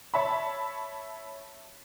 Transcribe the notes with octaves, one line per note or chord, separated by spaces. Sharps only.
C#5 E5 A5 B5